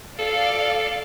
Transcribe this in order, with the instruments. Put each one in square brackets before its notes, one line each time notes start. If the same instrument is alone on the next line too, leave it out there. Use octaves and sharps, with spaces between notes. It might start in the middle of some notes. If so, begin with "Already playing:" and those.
[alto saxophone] A4 [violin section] D5 F5